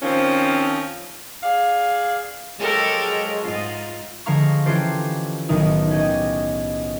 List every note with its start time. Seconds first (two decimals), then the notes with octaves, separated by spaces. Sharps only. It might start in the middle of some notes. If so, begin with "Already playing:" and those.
0.02 D#3 F3 C4 C#4
1.43 G#4 D5 F5
2.60 F3 F#3 G#3 G4 A4 A#4
3.42 G#2 F4
4.26 D3 F3 G#3 F5 A#5 C#6
4.66 E3 C#4 F4 G4 A4 C5
5.49 B1 A2 D#3 D#4
5.91 C#4 G4 D#5